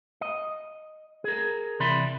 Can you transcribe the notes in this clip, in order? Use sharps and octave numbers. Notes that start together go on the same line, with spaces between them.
D#5
G#4 A#4
C3 E3 D5 E5 B5 C6